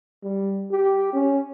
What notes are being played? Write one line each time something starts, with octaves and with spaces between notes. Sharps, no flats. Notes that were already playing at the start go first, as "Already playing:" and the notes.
G3
G4
C#4